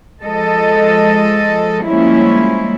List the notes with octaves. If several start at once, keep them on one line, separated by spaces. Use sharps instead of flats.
F3 G#3 A4 D#5
F3 G3 G#3 A#3 C#4 E4